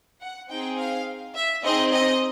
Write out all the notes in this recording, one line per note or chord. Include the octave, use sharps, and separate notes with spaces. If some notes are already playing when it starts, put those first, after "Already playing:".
F#5
C4 D#4 G#4 G5
F5
E5
C4 D#4 G#4 D#5
D#5